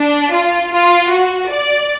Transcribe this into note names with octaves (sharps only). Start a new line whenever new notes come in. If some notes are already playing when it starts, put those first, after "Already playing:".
Already playing: D4
F4
F4
F#4
D5